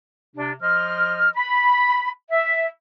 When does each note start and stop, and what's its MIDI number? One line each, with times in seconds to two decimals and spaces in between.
0.36 0.53 48
0.36 0.53 62
0.62 1.30 53
0.62 1.30 75
0.62 1.30 84
0.62 1.30 89
1.36 2.10 83
2.31 2.66 76